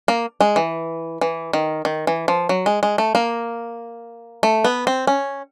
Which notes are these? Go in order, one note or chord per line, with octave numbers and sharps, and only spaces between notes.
A#3
G#3
E3
E3
D#3
D#3
E3
F3
F#3
G#3
G#3
A3
A#3
A3
B3
C4
C#4